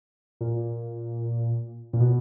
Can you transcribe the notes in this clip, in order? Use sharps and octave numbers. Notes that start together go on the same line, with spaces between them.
A#2
A#2
B2